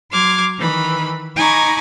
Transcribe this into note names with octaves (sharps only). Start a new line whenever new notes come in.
F#3 C6 D6 F6 G#6
D#3 E3 B5
D#4 G#5 A#5 B5 C#6 D6